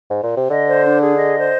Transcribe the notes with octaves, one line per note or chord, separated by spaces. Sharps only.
G#2
A#2
C3
D3 D#5
C5
D4
G#4
D#5
C5